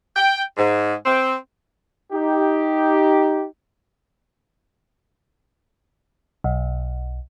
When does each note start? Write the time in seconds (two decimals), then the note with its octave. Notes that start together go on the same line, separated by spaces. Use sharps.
0.15 G5
0.58 G#2
1.06 C4
2.12 D#4 G4
6.44 B1